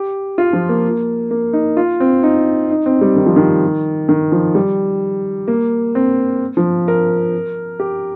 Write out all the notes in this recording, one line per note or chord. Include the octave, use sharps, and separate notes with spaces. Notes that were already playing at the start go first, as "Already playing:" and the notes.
Already playing: G4
F4
F3
A#3
A#3
D#4
F4
C4
D#4
D#4
C4
G3
D#3
F3
D#3
D#3
F3
G3
A#3
C4
F3
A#4
G4